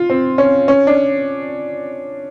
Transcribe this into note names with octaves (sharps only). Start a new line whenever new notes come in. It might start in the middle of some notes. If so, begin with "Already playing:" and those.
Already playing: F4
C4
C#4
C#4
D4